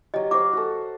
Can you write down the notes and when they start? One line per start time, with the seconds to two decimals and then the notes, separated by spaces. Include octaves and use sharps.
0.14 F#3 G4 D#5
0.31 F#4 C5 F5 D6
0.53 F#4 A4